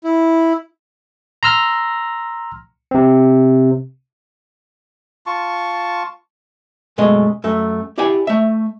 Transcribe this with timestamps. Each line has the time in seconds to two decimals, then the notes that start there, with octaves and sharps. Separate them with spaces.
0.04 E4
1.43 A#5 C6 E6 F6 A#6
2.91 C3 C4
5.26 F4 A5 C#6
6.98 F#2 B2 G#3 A3 D#5
7.44 F#2 A3
7.98 E4 G4 D5 F#5 G#5
8.27 A3 E5